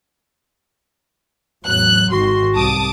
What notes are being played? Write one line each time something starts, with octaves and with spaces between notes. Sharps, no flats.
E2 A2 F#3 F#6
G#1 G#2 D#3 F#4 C6
C2 A5 D6 D#6